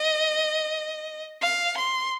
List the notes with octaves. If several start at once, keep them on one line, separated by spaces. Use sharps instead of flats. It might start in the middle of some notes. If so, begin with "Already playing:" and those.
Already playing: D#5
F5
C6